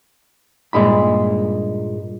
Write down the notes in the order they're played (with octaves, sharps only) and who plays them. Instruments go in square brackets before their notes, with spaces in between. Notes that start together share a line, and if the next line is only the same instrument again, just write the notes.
[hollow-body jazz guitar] G2 A#2 G#3 D#4 B5